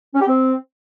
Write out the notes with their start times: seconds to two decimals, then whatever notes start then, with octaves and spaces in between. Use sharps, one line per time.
0.14 C#4
0.21 G4
0.27 C4